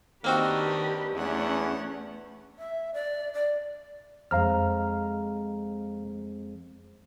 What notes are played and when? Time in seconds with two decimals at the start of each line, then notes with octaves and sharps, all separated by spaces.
0.24 D#3 A#3 C4 D4 D#4 F#4 G4 B4
1.15 E2 A3 C#4 D4 F#5
2.59 E5
2.94 D5
3.34 D5
4.31 F2 G#3 F5 A#5 F6